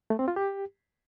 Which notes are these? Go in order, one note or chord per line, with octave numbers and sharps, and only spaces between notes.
A3
C4
F4
G4